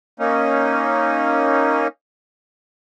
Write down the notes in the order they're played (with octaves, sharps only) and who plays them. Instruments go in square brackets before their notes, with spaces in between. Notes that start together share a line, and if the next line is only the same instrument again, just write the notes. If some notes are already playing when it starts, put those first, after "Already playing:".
[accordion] A#3 C#4 D#4